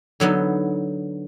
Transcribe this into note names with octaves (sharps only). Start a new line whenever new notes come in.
D3 F#3 B3 D#4